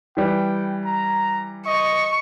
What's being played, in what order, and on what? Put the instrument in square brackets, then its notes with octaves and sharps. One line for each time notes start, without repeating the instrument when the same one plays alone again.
[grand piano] E3 G3 [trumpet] G5
[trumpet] A#5
[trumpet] D#5 [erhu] C#6